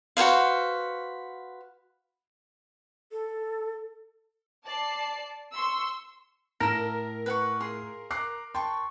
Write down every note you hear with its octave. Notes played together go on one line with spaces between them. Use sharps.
F#4 B4 C5 F5
A4
D5 A5 C7
C6 C#6 E6
A2 E4 A4 A#4 A#6
B4 F#5 C#6
F4 G#4 C6
A#5 D6 F#6 C7
G5 A5 C6 C#6